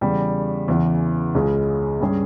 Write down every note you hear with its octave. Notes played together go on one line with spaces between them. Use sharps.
E2 C#3 G3
E2 C#3 E3
C#2 C#3 G#3 C#4
G2 G3 C#4 G#4